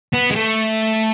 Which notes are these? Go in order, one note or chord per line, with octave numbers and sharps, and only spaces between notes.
B3
G#3
A3